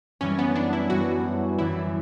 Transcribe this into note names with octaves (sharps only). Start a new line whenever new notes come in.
F#2 E3 G3 C#4
B3
D4
E4
F#2 E3 G3 F#4
F#2 E3 G3 E4